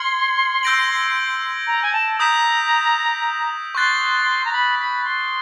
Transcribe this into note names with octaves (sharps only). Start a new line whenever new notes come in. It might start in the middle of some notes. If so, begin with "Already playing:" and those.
Already playing: C6 F6 G#6 C#7 F#7
E6 G6 A#6 D7 F#7
A#5
G#5
A5
A#5 D#6 G6 B6 E7
C6 C#6 F#6 A6
A#5
B5
B5
C6